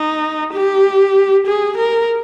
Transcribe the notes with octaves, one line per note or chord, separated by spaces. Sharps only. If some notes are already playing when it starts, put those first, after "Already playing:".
Already playing: D#4
G4
G#4
A#4